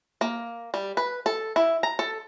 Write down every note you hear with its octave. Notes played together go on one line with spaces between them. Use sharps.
A#3
G3
B4
A4
E4
A#5
A4